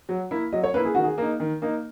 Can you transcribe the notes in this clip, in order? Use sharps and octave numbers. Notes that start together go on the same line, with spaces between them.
F#3
A#3 E4
F#3 D#5
C#5
A#3 E4 B4
G#4
D#3 F#4
G#4
A#3 D#4
D#3
A#3 D#4